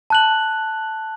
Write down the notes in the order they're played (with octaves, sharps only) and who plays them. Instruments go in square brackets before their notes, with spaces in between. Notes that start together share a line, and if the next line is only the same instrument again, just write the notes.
[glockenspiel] A5 F#6 F#7